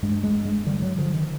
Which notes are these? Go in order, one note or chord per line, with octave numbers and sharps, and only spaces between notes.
G2 G#3
G#3
G2
G#3
D3 G3
F#3
D3 F3
D#3